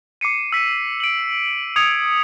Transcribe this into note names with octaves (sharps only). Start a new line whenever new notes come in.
D6 C7 C#7 D#7
E6 B6 C#7 D#7
D7 F#7
D#6 G#6 C#7 F7